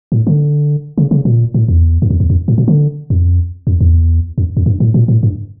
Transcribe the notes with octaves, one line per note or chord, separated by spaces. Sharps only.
A2
D3
C#3
C#3
A#2
A2
E2
G2
F2
E2
F2
A2
A#2
D3
F2
F2
E2
F2
F2
G2
A2
A#2
A2
G2